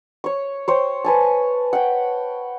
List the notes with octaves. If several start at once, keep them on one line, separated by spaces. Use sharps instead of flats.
C#5 C#6
C5 C#5 G5
B4 G#5 A5
F#5 G5